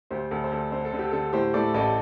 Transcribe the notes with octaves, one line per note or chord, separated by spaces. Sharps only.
D2 G4 C5
D2 A4
C5
D2 A4
D3 C5
A4
D3
G4
D3 A4
A2 G4 C5
A2 A4 D5
A1 A4 D5